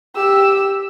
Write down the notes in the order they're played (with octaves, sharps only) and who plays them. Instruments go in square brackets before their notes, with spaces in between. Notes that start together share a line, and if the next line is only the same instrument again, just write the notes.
[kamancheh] G4 E6